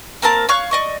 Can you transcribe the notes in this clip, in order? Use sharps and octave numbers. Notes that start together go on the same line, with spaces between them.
A#3 C4 A#4 A5
C#5 F5 C#6 F#6
D5 D#5 C#6